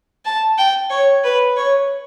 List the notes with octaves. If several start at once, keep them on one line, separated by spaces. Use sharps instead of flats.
A5
G5
C#5
B4
C#5